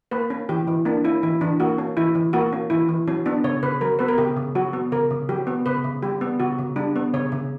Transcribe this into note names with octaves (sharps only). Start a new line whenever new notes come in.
A#3 B4
C#4
E3 G4
E3
A#3 D4
C#4 E4
E3 E4
E3 D4
A#3 F#4
C#4
E3 E4
E3
A#3 F#4
C#4
E3 E4
E3
F#3 C#4
B3 D4
C#3 C#5
C#3 B4
F#3 A#4
B3 B4
A#4
C#3 G4
C#3
F#3 F#4
B3
C#3 A#4
C#3
F#3 G4
B3
C#3 B4
C#3
G3 G4
B3
C#3 F#4
C#3
G3 D4
B3
C#3 C#5
C#3